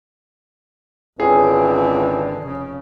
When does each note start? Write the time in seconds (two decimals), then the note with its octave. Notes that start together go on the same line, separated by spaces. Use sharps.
1.20 G#1 C#2 D3 E3 C4 G#4
2.44 F1 C#3